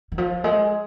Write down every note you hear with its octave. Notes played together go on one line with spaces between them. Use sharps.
D#3
F3
G#3